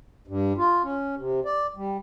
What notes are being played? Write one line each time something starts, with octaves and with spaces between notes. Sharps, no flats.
G2
F4
C#4
C3
D5
G3